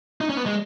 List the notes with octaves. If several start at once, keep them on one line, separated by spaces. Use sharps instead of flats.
D#4
C#4
B3
G#3